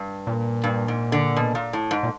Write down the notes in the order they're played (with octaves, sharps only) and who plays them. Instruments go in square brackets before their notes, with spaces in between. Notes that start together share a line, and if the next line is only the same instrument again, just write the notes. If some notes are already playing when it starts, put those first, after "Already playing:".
Already playing: [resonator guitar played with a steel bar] G2
[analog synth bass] A#2
[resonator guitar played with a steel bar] G2
G#2
D3
B2
A#2
A2
G#2
[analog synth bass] A#2